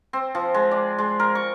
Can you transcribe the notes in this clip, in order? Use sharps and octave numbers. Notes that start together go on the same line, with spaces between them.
C4
F3
G#3
D5
G#3
A#4
C#6